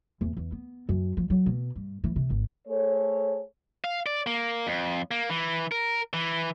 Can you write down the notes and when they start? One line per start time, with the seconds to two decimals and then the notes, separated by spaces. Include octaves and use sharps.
0.21 E2
0.37 E2
0.52 B3
0.89 F#2
1.17 F3
1.30 F#3
1.46 B2
1.76 G2
2.04 E3
2.16 C3
2.30 G#1
2.68 A3 G#4 A4 C5 C#5
3.84 F5
4.06 D5
4.27 A#3
4.67 F2
5.11 A#3
5.29 E3
5.72 A#4
6.13 E3